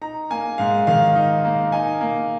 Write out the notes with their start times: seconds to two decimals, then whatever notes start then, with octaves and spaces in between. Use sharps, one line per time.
0.01 D#4 A#5
0.30 A#3 G#5
0.58 G#2 F5
0.87 D#3 F5
1.15 D#4
1.45 A#3
1.72 D#4 G#5
2.01 A#3